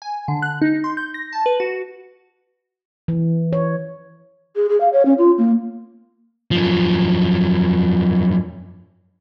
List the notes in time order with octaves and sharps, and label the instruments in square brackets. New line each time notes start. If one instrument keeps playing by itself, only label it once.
[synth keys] G#5
D3
F#6
D#4
C6
G6
A#6
A5
B4
F#4
[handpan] E3
C#5
[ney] G#4
G#4
F5
C#5
C#4
F4
A#3
[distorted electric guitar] F#2 F3